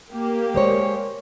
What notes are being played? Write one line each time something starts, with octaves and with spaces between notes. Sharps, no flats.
A#3 G4
G#3 C5 C#5